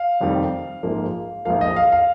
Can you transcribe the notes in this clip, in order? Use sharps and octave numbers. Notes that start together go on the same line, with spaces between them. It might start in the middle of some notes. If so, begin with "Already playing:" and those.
Already playing: F5
F1 F2 D#3 G3
A#1 G#2 F3 A#3
A#1 G#2 F3 A#3 F5
D#5
F5
F5